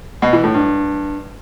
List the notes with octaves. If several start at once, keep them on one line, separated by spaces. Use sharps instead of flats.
B2
E3
A2
G2